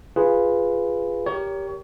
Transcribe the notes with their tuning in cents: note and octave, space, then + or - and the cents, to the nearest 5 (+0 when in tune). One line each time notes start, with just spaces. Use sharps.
F4 +0 G#4 -5 B4 +0
G4 +0 A#4 +0 C#5 +30